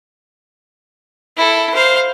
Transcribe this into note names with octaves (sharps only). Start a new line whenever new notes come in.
E4 A4
C5 F5